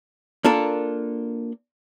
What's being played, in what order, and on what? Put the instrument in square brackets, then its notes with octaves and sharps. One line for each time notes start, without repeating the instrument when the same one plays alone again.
[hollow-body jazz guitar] A#3 D4 F4 A4 A#4